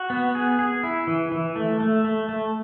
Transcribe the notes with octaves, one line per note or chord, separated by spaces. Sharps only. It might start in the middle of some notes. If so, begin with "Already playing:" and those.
Already playing: F#4
B3
G#4
G#4
E4
E3
E3
A3
A3
A3
A3